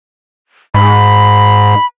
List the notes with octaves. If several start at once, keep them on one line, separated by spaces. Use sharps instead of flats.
G#2 B5